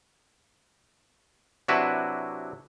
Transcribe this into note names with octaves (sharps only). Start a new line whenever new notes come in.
C3 F#3 D4 E4 F#4 B4